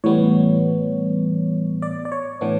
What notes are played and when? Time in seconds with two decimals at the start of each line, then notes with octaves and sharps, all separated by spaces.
0.04 A2 E3 G3 B3 C#5
1.82 D5
2.05 D5
2.12 C#5
2.41 A2 E3 B3 D4